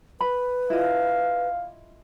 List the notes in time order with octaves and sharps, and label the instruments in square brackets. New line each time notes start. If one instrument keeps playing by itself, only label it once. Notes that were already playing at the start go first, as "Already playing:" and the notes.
[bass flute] B4 [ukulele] B5
[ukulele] E4 F4 D#5 [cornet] F5